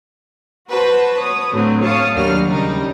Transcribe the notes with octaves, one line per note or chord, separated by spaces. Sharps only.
F#4 B4 C5 A5
C#5 D#6
A2 D3 F#3 C4
C#5 F5 A5 D#6
D#2 F#3 G3 D4 A#4 F6
C#3 G3 D#4